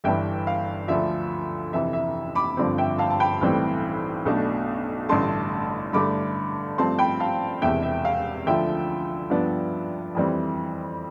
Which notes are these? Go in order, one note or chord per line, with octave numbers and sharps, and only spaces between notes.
G1 G2 E3 E5 G5
F5
D2 D3 F3 E5
F2 C3 E3 E5
E5
B5 D6
G1 G2 D3 F3 C4
E5 G5
F5 A5
A5
G5 B5
B1 A2 E3 G3 C4
B1 B2 A3 D4
A1 G2 D3 A3 A5 C6
G2 D3 A3 B5 D6
G2 F3 A3 C4 A5 C6
G5 B5
F5 A5
E1 E2 C3 E5 G5
E5
F5
D2 D3 F3 E5 G5
G2 F3 B3 D4
F2 E3 G3 C4